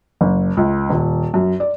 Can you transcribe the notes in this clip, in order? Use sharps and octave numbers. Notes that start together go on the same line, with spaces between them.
F#1
C#2
D#1
F#2
D5